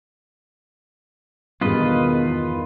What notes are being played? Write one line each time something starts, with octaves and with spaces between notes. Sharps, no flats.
E2 G2 B2 D#3 G#3 F4 B4 D#5